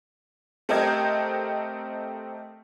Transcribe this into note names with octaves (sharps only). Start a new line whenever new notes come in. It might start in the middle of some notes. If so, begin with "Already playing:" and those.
A3 C4 G4 A#4 D#5 G#6